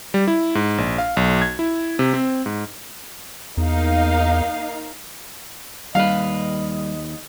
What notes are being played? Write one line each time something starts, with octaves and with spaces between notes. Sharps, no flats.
G3
E4
G#2
A#1
F5
B1
G#6
E4
C3
C4
G#2
E2 A#3 D#4 F5
D#2 G3 B4 D#5 F5